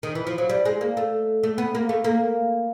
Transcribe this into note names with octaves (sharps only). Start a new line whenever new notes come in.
D#3
E3
F3
F#3
G3
G#3
A#3
A3
A3
B3
A#3
A3
A#3